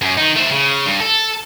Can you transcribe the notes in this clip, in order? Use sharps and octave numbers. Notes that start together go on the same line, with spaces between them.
F#2
D#3 D#4
A3 C5
C#3
G2
A4